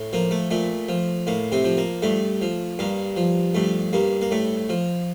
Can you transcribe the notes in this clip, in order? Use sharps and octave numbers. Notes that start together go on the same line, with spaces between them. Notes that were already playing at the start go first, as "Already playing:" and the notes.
Already playing: A2
F3 A#3
A3
A#2 A3
F3
A2 A#3
C3 C4
F3
A#3
G2 A3
F3
G2 A#3
F3
G2 A3
G2 A#3
A#3
A2 A3
F3